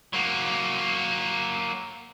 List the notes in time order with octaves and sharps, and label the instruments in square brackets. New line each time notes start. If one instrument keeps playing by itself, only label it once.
[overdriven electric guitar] F#3 A#3